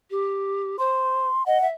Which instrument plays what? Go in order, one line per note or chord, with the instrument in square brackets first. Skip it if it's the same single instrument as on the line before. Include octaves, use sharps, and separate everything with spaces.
[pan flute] G4
[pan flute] C5 [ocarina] C6
[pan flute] D#5 [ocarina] F#5
[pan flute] E5